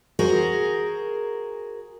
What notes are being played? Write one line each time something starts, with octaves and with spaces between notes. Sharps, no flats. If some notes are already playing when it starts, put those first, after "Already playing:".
F#4 G#4 A#4 C5